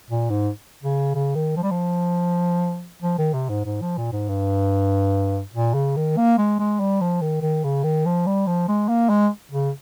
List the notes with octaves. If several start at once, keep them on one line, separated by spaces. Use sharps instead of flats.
A#2
G#2
C#3
C#3
D#3
F3
G3
F3
F3
D#3
C3
G#2
G#2
F3
A#2
G#2
G2
A#2
C#3
D#3
A#3
G#3
G#3
G3
F3
D#3
D#3
C#3
D#3
F3
G3
F3
G#3
A#3
G#3
C#3